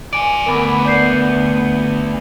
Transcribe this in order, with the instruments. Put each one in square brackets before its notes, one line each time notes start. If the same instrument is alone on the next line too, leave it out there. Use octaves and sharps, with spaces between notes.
[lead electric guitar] D5 G#5 [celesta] D6 D7
[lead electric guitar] D2 [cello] B3 [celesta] A#4 B5 D6
[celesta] D5 G6 C7